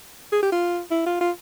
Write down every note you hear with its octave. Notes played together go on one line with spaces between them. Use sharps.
G#4
G4
F4
E4
F4
F4